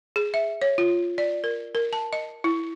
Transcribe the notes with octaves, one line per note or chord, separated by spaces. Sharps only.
G#4
E5
C#5
F4
D5
A#4
A#4
A5
D#5
E4